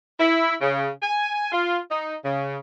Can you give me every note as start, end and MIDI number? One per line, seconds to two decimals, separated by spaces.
0.20 0.55 64
0.61 0.89 49
1.03 1.51 80
1.52 1.79 65
1.91 2.16 63
2.24 2.57 49